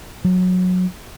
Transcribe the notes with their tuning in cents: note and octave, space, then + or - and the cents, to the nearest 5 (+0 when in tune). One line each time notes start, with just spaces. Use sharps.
F#3 -20